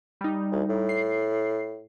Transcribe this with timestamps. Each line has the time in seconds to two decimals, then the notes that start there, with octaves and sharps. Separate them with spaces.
0.21 G3 D#4
0.51 D2
0.69 A2
0.89 C7